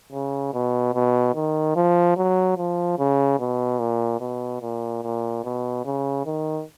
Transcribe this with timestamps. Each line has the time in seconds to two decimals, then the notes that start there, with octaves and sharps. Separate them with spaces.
0.12 C#3
0.53 B2
0.94 B2
1.35 D#3
1.76 F3
2.17 F#3
2.58 F3
2.99 C#3
3.40 B2
3.79 A#2
4.20 B2
4.61 A#2
5.03 A#2
5.44 B2
5.85 C#3
6.26 D#3